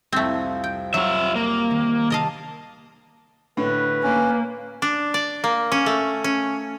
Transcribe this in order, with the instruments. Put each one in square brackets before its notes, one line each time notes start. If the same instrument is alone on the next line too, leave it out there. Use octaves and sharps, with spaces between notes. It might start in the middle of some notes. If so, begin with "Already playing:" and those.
[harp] C2 F2 [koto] A3 C4
[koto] G5
[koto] F#3 [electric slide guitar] F4 E5
[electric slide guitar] A#3
[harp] D#3
[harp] C3 A5 [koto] A#4 D#5 F5
[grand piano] A2 D3 [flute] B4
[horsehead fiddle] A#3 [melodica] C#4
[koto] D4
D5
A#3
C#4
A3
C#4